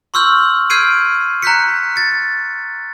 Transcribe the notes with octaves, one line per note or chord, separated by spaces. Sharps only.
C6 C#6 E6 F6 G6 F#7
F6 G6 G#6 C7 D7 D#7
A#5 F#6 G6 B6 C#7
A6 C#7